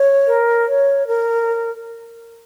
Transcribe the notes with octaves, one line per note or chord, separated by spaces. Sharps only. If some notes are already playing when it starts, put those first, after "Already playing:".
Already playing: C#5
A#4
C#5
A#4